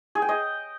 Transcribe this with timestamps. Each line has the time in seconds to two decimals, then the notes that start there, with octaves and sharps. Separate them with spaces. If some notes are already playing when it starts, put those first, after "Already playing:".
0.15 G#4
0.22 G5
0.29 D#5